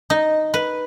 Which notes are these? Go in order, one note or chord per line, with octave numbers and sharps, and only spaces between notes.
D#4
B4